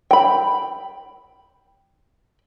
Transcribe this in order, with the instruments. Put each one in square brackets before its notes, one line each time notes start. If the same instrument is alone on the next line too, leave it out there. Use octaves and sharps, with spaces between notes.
[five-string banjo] G5 B5